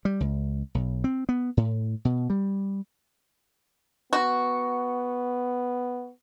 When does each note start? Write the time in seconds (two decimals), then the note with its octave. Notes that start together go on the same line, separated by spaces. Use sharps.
0.05 G3
0.20 C#2
0.75 B1
1.04 C4
1.29 B3
1.57 A2
2.05 B2
2.30 G3
4.13 B3 F#4